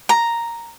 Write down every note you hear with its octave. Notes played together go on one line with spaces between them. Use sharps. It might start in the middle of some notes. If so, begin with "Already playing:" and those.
A#5